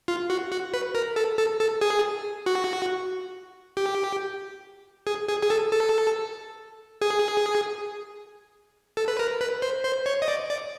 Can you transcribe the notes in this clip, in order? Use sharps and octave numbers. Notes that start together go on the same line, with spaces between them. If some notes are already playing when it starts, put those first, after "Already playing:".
F4
F#4
F#4
B4
A#4
A4
A4
A4
G#4
F#4
G4
G#4
G#4
G#4
A4
A4
G#4
A4
B4
A#4
B4
C5
C5
C#5
D#5
D5
D5